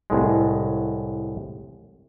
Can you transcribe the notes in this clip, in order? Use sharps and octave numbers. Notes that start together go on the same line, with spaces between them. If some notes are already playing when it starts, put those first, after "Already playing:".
C2 A2 G#3